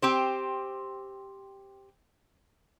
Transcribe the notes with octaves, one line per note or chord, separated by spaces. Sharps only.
C4 G4 C5